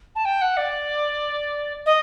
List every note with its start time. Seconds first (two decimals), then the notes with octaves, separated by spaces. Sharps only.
0.15 A5
0.25 G5
0.41 F#5
0.57 D5
1.86 D#5